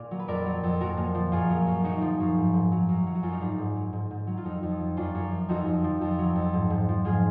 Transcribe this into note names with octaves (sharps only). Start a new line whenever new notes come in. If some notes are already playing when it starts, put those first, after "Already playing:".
Already playing: A#2 A#4 D5
F#3
B4
F2 A#4 D5
F#3
F2
A#2 F#4 A#4
A#2
F3
F#2 F4 G#4
F#3
F#2
F#2 D#4 F#4
F3
F#2
G#2
G#2
F#3
F#2
F#3
F#4
F#2 F4
D#4
G#2 D4
G#2
F#3
G#2
G#2
F#3
F4
F2 D#4
F2
F3
F#2 D4 F4
F#2
F3
F2 D#4 F#4
F2
F3
F2
F#3
F2
G#2
G#2
F3
G#2 F4 G#4